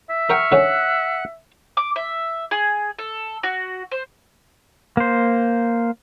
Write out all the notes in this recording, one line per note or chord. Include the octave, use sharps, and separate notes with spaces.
E5
A#4 F#5 G5 C#6 F6
D3 D#3 C#4 F#5 F#6
D6
E5
G#4
A4
F#4
C5
A#3 C5